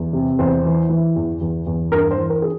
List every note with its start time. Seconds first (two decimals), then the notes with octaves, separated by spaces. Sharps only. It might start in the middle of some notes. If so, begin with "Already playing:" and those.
Already playing: E2
0.13 C3
0.39 E2 C5
0.65 E3
0.89 E3
1.16 E2
1.41 E2
1.67 E2
1.92 G2 A#4
2.11 C5
2.17 E3
2.30 A#4
2.42 G#4